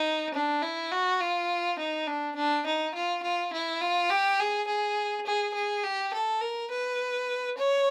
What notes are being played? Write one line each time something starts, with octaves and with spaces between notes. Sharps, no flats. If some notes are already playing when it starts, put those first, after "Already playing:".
Already playing: D#4
D4
E4
F#4
F4
D#4
D4
D4
D#4
F4
F4
E4
F4
G4
G#4
G#4
G#4
G#4
G4
A4
A#4
B4
C#5